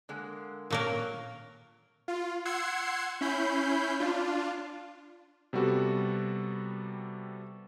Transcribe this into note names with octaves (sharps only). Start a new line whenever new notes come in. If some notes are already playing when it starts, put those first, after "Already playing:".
D3 G#3 A#3
A#2 F#3 A#3 C#4 A#4 C#5
F4
F#5 C6 E6 G#6 C7 C#7
C#4 E4 B5 G6 C7
D4 F4
C3 G3 B3 F#4 A4